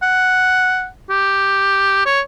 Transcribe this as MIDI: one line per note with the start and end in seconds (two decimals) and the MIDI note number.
0.02 0.87 78
1.10 2.02 67
2.06 2.20 73